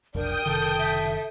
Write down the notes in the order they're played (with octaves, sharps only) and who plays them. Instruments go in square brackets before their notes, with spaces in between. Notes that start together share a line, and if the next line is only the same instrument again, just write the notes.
[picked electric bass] F1 B1 F2 [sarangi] D4 [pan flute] A#4 [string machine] G5 D#6 G6
[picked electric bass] F#1 C3 D#3 [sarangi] A4
[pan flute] E5